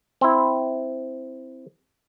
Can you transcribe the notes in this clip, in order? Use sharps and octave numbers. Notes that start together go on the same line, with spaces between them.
C4 E4